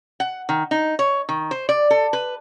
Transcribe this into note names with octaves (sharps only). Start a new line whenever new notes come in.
F#5
D#3
D#4
C#5
D#3
C5
D5
A4
B4